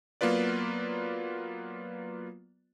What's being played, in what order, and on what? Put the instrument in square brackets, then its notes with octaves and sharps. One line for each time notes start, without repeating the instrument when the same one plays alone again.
[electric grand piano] F#3 A#3 B3 F4 B4 D5